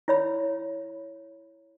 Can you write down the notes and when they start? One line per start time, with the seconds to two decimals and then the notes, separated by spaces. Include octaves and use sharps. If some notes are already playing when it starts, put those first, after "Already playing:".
0.08 E4 C#5 B5